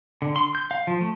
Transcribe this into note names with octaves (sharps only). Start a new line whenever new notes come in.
D3
C6
G6
F5
F3
A3